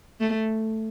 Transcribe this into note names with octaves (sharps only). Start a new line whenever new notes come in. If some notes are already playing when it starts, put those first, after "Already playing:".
A3